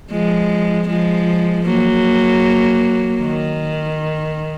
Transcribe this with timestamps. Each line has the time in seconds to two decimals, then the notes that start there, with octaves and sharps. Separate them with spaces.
0.11 F3 G#3
0.88 F3 G#3
1.65 F#3 A#3
3.21 D#3